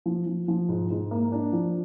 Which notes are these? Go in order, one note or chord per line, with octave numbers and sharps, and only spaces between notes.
F3
F3
F3
G#2
G#2
A#3
D4
F3